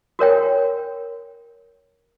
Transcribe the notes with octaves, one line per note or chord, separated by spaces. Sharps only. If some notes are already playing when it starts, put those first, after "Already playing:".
F#4 A#4 C#5 G5